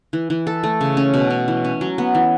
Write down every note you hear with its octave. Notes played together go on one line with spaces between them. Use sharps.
E3
E3
A4
A3
C#3
C#4
B2
C#4
E3
C#4
F#3
B3
E3